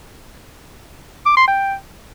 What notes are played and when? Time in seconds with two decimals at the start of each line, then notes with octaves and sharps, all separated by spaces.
1.26 D6
1.37 C6
1.48 G5